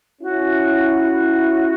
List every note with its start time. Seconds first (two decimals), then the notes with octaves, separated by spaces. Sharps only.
0.21 C#4 E4 F#4
0.93 F#4